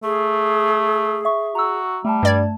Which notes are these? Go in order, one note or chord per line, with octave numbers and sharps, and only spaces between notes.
A3 G#4
E5 C#6
F#4 A#5 E6
G3 A3 A5
G2 D5 G#6